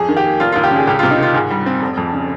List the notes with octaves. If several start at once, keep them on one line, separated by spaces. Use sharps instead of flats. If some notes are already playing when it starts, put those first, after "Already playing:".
Already playing: F2 G#4
D#3
G4
A#3
F1 F4
D#2 F4
G4
C#3 G#4
C#2 G4
C3 F4
D#4
D#3 F4
G#2 G#4
G3
C4
F1
F2
C#3